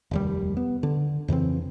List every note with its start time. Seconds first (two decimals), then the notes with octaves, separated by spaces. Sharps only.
0.11 F1 D#2 G3
0.57 B3
0.83 D3
1.28 F2 C#3 E3 C4